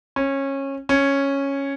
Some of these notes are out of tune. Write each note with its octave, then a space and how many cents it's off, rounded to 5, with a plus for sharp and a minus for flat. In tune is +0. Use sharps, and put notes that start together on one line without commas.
C#4 -20
C#4 -5